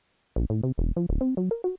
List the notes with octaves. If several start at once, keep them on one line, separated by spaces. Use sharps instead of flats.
A#1
A2
C3
E1
F3
D1
C4
F#3
A#4
F#4